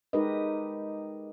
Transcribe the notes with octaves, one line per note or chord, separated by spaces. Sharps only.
G#3 D#4 G4 A#4 B4 D#5